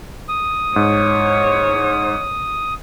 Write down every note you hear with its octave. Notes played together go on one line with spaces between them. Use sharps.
D#6
G#2 C#5